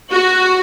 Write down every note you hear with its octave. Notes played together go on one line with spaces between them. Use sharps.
F#4